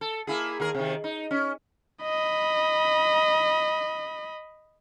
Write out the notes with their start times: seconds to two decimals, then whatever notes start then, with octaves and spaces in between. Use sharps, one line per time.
0.01 A4
0.27 A#3 E4 G#4
0.60 D#2 G#4 A#4
0.75 C3 D#3
1.04 D#4
1.31 C#4
2.02 D#5 B5